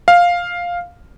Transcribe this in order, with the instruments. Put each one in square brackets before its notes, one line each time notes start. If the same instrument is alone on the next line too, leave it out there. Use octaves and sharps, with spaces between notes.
[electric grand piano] F5